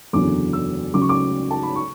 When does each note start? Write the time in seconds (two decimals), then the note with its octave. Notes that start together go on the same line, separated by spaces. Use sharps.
0.13 F#1 E2 D3 F#3 D6
0.53 E6
0.94 C#2 C#3 F#3 D6
1.02 C#6
1.09 D6
1.51 A5
1.63 B5
1.76 C#6